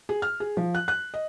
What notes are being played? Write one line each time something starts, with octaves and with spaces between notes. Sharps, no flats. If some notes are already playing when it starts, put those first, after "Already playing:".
G#4
F6
G#4
F3
F#6
F#6
D#5